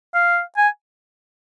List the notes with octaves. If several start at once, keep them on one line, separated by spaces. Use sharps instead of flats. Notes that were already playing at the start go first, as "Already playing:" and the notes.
F5
G#5